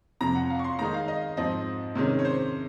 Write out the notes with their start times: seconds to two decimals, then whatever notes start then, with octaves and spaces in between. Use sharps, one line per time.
0.21 F2 C3 F3 A#5
0.35 F#5
0.50 F5
0.59 C#6
0.64 C6
0.79 D#3 G#3 D#4 A#5
0.94 F5
1.08 D#5
1.37 G#2 F3 C4 D#5
1.95 C3 D#3 G#3 C#4
2.19 C#5
2.25 C5